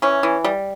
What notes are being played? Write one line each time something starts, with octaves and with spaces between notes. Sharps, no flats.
E3 C#4
E3
G3